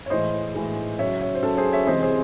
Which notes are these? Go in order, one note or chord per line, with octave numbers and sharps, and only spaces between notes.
C#5
A2 E3 G#3 C5 D#5
A2 E3 G#3
C#3 F#3 C#5 E5
C#5 E5
C5
C#3 F#3 A4
G#4 C5
C#5 E5
C3 E3 G#3 C5 D#5
G#4 C5